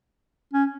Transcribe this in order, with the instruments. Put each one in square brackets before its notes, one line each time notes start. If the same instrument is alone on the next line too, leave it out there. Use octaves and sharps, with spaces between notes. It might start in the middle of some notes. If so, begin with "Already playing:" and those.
[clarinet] C#4